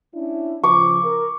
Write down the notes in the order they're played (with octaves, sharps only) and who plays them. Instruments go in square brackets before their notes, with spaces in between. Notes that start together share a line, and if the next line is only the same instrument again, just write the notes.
[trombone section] C#4 D4 E4
[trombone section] C#3 F3 [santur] C#6 D6
[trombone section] A#4